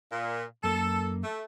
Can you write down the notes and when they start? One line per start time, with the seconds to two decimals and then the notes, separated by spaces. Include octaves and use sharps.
0.12 A#2
0.64 F#2 A#3 A4
1.23 A3